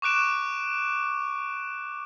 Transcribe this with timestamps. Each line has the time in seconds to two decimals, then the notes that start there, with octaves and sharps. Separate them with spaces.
0.02 C#6 D6 F#6 D7 E7